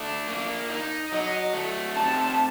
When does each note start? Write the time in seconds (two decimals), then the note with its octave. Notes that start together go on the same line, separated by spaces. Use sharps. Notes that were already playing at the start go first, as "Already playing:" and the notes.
Already playing: A3 D4
0.28 A#3
0.70 D#4
1.12 F#3 D#5
1.53 A3
1.96 C3 A5